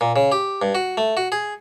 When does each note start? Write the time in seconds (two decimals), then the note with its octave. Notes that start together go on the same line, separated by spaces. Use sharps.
0.01 A#2
0.16 C#3
0.32 G4
0.62 G2
0.75 F#4
0.97 A3
1.17 F#4
1.32 G#4